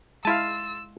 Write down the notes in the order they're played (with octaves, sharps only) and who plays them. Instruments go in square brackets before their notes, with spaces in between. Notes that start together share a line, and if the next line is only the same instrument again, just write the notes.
[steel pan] G#3 F5 [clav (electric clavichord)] E4 A5 [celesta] C6 A6 D#7 [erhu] E6